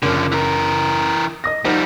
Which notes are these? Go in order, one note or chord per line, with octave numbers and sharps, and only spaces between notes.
F#1 D3 F3
E3 A#4
D#5 D#6 A#6
F3 G3 D#4 C5 F#5